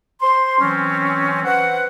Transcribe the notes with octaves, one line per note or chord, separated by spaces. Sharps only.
C5 C6
E3 F#3 C4 C#4
B4 C5 F#5